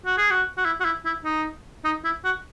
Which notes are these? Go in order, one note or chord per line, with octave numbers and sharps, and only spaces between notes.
F#4
G#4
F#4
F#4
E4
F#4
E4
E4
D#4
D#4
E4
F#4